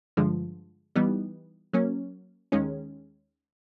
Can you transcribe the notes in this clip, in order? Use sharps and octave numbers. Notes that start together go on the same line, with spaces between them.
G2 D3 F3 G#3
E3 G3 B3 D#4
F#3 A#3 C#4
D#2 D#3 G#3 C#4